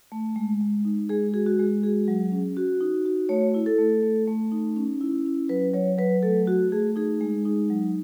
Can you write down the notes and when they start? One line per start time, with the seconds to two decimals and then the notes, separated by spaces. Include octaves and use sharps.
0.12 A3
0.36 G#3
0.61 G#3
0.85 D#4
1.09 G#3 G#4
1.34 F#4 G#4
1.46 F#4
1.59 G#3
1.83 F#4 G#4
2.08 F#3
2.32 C#4
2.57 F#4
2.81 D#4
3.06 F#4
3.29 A3 C#5
3.54 E4
3.66 A4
3.78 A3
4.02 A3
4.28 A3
4.52 D#4
4.77 C#4
5.01 E4
5.25 C#4
5.49 F#3 B4
5.74 F#3 C#5
5.98 F#3 B4
6.23 A3 A4
6.47 F#4
6.72 A3 G#4
6.96 D#4 G#4
7.21 G#3
7.45 D#4
7.70 F#3